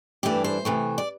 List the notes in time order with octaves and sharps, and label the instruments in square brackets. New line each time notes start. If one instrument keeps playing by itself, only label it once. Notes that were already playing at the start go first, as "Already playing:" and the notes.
[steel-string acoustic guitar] G2 E3 A3 D4 G4
C5
C3 E3 A3
D5